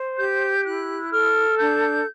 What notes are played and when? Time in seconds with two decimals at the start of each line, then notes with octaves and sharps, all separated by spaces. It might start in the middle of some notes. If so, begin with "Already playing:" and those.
Already playing: C5
0.18 G4 G6
0.65 E4 F#6
1.12 A4 F6
1.58 D4 G6